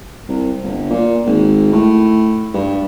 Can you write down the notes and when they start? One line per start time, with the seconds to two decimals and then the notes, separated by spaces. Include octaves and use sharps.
0.29 C2
0.63 G1
0.90 A#2
1.26 G#1
1.72 A2
2.54 G2